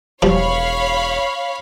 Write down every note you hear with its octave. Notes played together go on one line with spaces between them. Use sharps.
E1 F3 G3 C#5 F5 B5